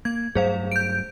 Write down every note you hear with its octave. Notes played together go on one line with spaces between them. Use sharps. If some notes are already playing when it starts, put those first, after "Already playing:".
A#3 G#6
G2 F#3 A3 G#4 C5 F5
G6 D7